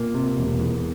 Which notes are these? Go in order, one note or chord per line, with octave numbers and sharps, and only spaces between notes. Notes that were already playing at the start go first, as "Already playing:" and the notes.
Already playing: A#2 A#3
C3
E1
E2